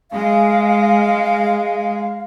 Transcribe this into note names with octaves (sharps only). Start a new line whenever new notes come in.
G#3 F5